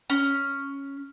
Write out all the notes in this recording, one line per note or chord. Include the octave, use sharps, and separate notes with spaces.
C#4